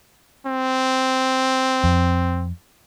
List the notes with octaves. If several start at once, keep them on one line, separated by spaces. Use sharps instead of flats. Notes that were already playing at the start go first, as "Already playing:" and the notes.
C4
F2